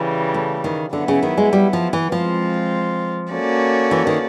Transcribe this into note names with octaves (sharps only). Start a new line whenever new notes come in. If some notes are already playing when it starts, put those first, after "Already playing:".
Already playing: C#3 E3 G3
A3
D#3
D3 F#3 B3 E4
C#3
D#3
G#3
G3
F3
E3
F3 G#3 C4 F4
A#3 C#4 F#4 A4 D5
E3
D#3